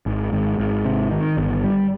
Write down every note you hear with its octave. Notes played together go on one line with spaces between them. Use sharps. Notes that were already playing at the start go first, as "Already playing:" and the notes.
G#1
G#1
G#1
C3
D#3
G1
G3